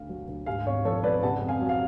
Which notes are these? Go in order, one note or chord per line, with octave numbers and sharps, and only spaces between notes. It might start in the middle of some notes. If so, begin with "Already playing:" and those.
Already playing: D2 C#3 F5
F#3
D2
G#2 F5 G#5
G#1 C#5 F5
F3 A4 C#5
C#5
G#1 B4 D5
C#3 F#5 A5
F2
F5 G#5
F#3
F5